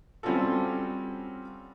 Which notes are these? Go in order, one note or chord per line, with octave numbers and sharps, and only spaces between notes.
G3 C4 C#4 F4 F#4 A4